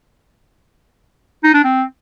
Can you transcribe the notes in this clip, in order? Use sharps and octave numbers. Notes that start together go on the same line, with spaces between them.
D#4
D4
C4